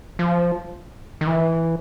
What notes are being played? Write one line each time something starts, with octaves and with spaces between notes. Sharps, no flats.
F3
D#3
E3